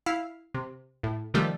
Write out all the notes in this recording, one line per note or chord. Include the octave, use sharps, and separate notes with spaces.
E4 F5
C3
A2
C3 D#3 F3 G3 A3